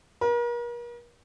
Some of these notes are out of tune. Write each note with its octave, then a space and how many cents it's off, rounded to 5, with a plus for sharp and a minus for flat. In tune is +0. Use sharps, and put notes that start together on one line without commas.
A#4 +40